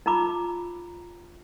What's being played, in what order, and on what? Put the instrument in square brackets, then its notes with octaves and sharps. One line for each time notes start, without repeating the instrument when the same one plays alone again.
[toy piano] D#4 F4 A#5 B5 D6